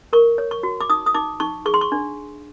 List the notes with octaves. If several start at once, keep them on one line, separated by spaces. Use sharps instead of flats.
A#4 C#6
C#5
C#6
F#4
D6
D#4 D#6
D#6
D#4 D6
D#4 C#6
G#4 C#6
C6
C#6
D4